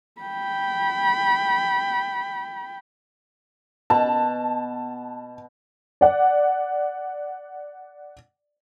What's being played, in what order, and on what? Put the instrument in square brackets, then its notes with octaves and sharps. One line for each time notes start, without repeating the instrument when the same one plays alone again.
[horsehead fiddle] G5 B5
[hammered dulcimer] B2 [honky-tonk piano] A5
[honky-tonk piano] D5 F#5